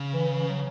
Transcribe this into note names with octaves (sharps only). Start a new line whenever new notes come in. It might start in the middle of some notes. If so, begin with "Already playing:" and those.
Already playing: C#3
E3
E3
F#3